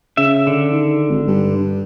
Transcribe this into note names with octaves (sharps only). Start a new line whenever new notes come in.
C#3 E5
D3
D#3
G#1
G2